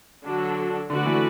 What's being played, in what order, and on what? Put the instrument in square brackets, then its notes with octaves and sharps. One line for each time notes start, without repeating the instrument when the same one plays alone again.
[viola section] D3 F#3 D4 F#4 A4
[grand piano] D3 [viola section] A3 F#4 B4 D5
[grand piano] E3